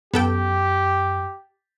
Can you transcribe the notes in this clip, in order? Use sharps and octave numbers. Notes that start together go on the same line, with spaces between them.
F#2 B3 G4 A4 G5